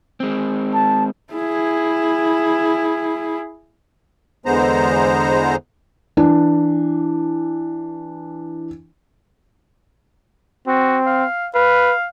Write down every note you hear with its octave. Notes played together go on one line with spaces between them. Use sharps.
G#3 C4
A5
E4 G#4
E2 D3 G#3 B3 C5 A#5
E3 D4
C4 F#4
F5
B4 F5